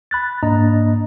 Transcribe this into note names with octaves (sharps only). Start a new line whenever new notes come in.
B5 F#6 A6
G#2 A#3 D4 D#5 A#5